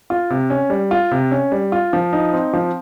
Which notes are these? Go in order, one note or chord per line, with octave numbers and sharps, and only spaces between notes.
F4
C3
C#4
G3
F4
C3
C#4
G3
F4
F3
D#4
C4
F3